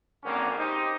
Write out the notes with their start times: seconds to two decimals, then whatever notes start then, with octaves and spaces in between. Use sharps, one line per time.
0.24 G#1 D3 A#3 C4 C#4 A#4
0.58 D#4 G4 C5